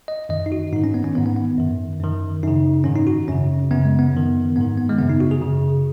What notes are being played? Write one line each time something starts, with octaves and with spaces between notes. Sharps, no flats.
D#5
F#2 D#3 D#5
D#4
F#4
G#2 D#3 D#4
C#4
B3
C#4
G#2 D#3 B3
B3
B3
F#2 D#3
F#2 D#3
F#2 C#3 D#4
G#2 D#3 C#4
D#4
F#4
F#2 C#3 C#4
F#2 C#3 B3
G#3
B3
F#2 D#3
G#2 D#3 B3
B3
G#3
F#2 C#3 B3
D#4
F#4
G#4
F#2 C#3